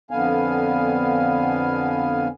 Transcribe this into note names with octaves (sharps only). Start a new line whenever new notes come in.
F2 D3 B3 F5 G#5